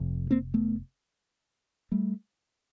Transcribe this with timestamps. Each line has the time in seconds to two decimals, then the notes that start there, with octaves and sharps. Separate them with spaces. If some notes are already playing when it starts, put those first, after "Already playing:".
Already playing: F1 F2 C3
0.30 A#3 C4
0.54 A3 B3
1.92 G3 A3